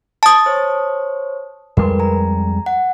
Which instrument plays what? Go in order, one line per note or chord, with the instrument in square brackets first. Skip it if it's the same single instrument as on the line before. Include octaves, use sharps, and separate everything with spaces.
[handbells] A5 D#6 [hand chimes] A6
[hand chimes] C5 C#5
[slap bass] F2 G3 G#3 [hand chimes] A#4 B4
[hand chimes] G#5 A#5
F#5